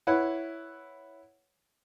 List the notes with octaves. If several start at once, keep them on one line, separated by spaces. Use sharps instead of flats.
E4 B4 C#5 F#5